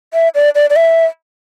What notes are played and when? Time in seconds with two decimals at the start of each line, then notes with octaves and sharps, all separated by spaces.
0.14 E5
0.35 D5
0.55 D5
0.70 D5
0.76 E5